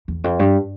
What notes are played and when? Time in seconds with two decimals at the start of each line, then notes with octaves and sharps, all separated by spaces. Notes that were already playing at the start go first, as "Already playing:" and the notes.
0.08 E2
0.24 F2
0.39 G2